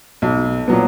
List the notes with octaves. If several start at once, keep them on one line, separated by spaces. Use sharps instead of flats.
B1
A#2 F#3 B3